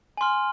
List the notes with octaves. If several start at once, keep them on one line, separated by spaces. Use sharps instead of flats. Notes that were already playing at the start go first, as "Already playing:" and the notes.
G#5 C6 F6